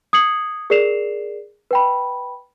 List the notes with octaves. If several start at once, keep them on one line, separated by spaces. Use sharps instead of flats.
D#6 G#6 C7 C#7 F#7
G#4 A#4 D5 C7 E7 F7
B4 G5 B5